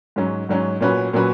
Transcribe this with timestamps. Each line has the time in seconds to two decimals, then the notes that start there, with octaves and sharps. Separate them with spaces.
0.16 G#2 F#3 C#4
0.49 G#2 F#3 C#4
0.81 A#2 F#3 C#4 F#4 B4
1.13 A#2 F#3 C#4 F#4 B4